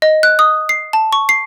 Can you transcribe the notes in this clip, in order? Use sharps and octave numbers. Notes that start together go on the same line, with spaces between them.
D#5
F#6
D#6
C7
A5
C#6
C7